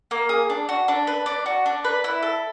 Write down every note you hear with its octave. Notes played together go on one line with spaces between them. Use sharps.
A#3
G#4
D4
F#4
D4
B4
D4
F#4
D4
B4
E4
A4